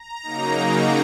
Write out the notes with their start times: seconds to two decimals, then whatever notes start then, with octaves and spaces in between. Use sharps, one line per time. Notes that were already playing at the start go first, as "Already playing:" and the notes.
Already playing: A#5
0.23 C#3 F#3 A#3 D#4